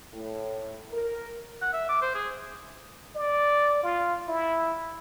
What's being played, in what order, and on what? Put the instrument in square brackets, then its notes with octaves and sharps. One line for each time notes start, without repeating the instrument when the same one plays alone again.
[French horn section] A2
A#4
[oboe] F#5
E5
D6
C5
G#4
[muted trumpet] D5
F4
E4